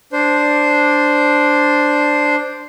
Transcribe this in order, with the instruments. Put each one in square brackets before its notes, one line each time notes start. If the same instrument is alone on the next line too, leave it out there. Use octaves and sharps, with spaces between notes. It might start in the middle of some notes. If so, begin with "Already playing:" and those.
[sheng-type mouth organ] D4 C5